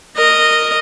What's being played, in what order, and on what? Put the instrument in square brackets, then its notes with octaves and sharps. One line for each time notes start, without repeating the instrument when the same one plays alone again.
[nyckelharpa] A#4 D#5